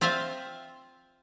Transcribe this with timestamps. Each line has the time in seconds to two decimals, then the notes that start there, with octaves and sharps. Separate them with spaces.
0.01 C4 F4 C5 E5 F5